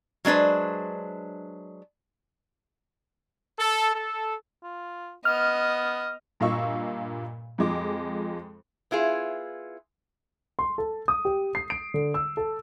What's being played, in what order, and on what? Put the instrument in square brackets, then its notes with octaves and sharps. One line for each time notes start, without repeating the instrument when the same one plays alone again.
[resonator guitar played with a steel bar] F#3 G#3 D4 B4 C5
[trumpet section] A4
A4
[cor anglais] F4
[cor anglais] B3 [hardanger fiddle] D#5 [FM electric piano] F6
[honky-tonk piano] G2 A#2 D#5 F5 C#6 E6
F2 F3 G#3 D6
[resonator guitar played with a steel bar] B3 E4 F4 G#4
[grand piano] C6
A4
D#6
G4
C7
D7
D3
E6
A4